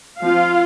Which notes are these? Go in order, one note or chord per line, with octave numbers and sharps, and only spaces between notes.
F3 C4 F4 F5